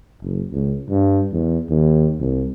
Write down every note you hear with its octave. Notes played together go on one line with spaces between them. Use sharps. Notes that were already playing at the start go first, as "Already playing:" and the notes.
F#1
C#2
G2
E2
D#2
C2